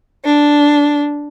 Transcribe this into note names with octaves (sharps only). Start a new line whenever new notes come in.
D4